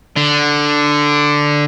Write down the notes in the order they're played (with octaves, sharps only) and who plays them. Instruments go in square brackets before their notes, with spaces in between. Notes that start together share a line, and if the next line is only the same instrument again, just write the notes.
[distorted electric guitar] D3